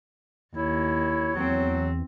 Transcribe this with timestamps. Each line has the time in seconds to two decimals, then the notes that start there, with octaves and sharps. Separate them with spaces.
0.56 D#2 E4 C#5
1.35 E2 F#3 C4